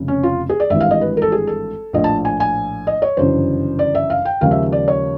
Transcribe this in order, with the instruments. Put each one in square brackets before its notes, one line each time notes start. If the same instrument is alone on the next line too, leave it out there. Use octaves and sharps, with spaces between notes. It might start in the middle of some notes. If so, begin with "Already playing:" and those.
Already playing: [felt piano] F1 F2 C#3
C#4
F4
G#4
D5
G#1 G2 E3 E5
F5
D#5
B4
A#4
A4
G#4
A4
A#1 A2 F3 D#5
A5
G#5
G#5
D#5
C#5
G1 F#2 C#3 E3 C5
D5
E5
F5
G5
D#2 C#3 F3 G#3 F5
E5
D5
C#5